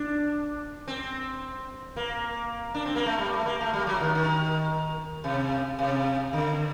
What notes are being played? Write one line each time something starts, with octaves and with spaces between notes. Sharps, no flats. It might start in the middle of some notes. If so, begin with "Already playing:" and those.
Already playing: D4
C4
A#3
D4
C4
A#3
A3
G3
A3
A#3
A3
G3
F#3
D#3
D#3
C3
C3
D3